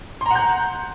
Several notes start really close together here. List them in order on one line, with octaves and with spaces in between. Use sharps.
C6 A#5 F#5 G6